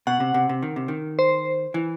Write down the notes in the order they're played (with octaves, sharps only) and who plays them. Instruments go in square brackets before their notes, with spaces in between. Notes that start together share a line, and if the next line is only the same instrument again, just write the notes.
[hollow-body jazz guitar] B2 [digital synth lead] F#5
[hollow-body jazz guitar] C3
C3
C3
D#3
C3
D#3
[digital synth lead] C5
[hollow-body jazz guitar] E3